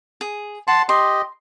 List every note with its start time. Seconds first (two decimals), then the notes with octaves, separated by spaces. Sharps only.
0.21 G#4
0.68 F#5 A5 C6
0.89 G4 D#5 C6